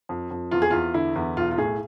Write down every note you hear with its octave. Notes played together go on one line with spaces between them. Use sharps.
F2
F2
E2 F4
G#4
E2 F4
D3 E4
E2
B1 F4
F4
A2 G#4